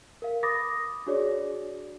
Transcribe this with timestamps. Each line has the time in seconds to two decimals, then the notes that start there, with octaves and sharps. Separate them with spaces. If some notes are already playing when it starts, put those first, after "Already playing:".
0.22 A#4 F5
0.43 B5 D6 D#6 A6 A#6
1.06 D4 F#4 G#4 C#5 D5